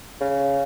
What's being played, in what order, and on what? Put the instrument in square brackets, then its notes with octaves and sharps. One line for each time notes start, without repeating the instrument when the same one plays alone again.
[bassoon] C#3